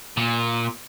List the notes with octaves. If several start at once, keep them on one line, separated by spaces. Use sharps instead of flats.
A#2